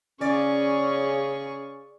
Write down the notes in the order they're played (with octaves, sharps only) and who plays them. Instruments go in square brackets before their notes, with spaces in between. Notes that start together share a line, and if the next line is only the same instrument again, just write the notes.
[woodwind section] C#3 C#4 [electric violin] G#4 C#6 [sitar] D5